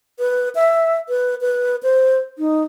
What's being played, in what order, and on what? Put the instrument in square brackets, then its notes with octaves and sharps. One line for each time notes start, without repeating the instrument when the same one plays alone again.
[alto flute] B4
E5
B4
B4
C5
D#4